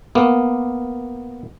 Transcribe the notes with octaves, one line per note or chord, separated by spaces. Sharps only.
A#3 B3